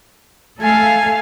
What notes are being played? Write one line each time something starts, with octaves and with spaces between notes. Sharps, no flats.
A3 A4 F5 G#5